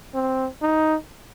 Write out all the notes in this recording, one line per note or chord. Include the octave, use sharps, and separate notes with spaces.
C4
D#4